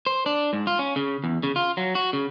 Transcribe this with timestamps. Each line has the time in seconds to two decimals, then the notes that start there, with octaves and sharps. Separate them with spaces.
0.06 C5
0.26 D4
0.53 G#2
0.67 F4
0.79 C#4
0.96 C#3
1.24 E2
1.43 C#3
1.56 F4
1.77 F#3
1.95 F#4
2.13 C#3